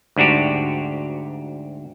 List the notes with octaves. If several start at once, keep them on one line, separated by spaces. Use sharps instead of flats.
D2 G#2 D4 F#4 G4